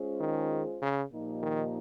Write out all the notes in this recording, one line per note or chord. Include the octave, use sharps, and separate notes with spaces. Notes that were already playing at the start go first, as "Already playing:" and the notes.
Already playing: G#3 C#4 F4 G#4 C5
D#3
C#3
A#2 F3 A#3 D#4 G4
D#3